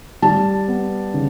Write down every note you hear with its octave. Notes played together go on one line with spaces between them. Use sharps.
G3 A5
B3
C#3